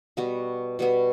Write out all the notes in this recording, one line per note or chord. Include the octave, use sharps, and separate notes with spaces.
B2 G3 B3 F#4
B2 G3 B3 F#4